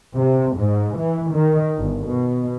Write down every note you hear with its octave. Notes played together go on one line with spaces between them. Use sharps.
C3
G#2
E3
D#3
G1
B2